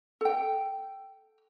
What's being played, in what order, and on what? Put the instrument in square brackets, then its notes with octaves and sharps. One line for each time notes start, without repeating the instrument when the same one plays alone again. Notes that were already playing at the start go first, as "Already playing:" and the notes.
[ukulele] A4 G5